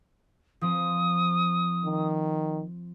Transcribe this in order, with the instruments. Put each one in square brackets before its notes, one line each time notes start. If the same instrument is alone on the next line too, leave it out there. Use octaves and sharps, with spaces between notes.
[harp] F3 C4 [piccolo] D#6
[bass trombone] D#3